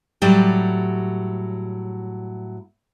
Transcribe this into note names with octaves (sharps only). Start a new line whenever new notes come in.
A2 F#3 G3 G4